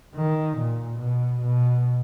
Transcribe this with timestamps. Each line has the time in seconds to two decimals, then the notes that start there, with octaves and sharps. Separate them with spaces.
0.16 D#3
0.57 A#2
1.00 B2
1.42 B2